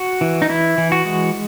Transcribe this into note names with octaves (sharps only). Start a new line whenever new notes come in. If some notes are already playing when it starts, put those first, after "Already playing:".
Already playing: F#4
E3
D#4
E3 E4
E3
F#4
G#3